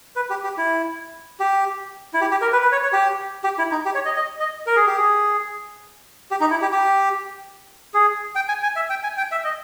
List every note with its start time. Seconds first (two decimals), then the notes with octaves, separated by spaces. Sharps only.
0.16 B4
0.30 G4
0.44 G4
0.58 E4
1.40 G4
2.14 E4
2.21 G4
2.31 G4
2.42 A#4
2.52 B4
2.63 B4
2.72 C#5
2.83 C#5
2.93 G4
3.44 G4
3.58 E4
3.72 D#4
3.85 G4
3.95 C#5
4.05 D#5
4.16 D#5
4.40 D#5
4.67 A#4
4.76 G#4
4.87 G4
4.96 G#4
6.31 G4
6.41 D#4
6.50 E4
6.62 G4
6.72 G4
7.94 G#4
8.35 G5
8.48 G#5
8.63 G#5
8.76 E5
8.90 G5
9.03 G#5
9.18 G5
9.31 E5
9.44 D#5